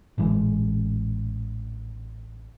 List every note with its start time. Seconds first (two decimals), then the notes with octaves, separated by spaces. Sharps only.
0.18 A1 A#2 E3 G#3